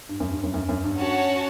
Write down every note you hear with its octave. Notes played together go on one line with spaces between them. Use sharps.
G2
F#2
G2
F#2
F#2
F#2
G2
C#4 F#4 C#5 F#5 A5